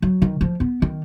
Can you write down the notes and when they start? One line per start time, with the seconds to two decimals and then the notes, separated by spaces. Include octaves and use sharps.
0.02 F#3
0.22 D#3
0.41 F3
0.60 B3
0.82 D#3